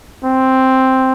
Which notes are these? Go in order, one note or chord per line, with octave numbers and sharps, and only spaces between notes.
C4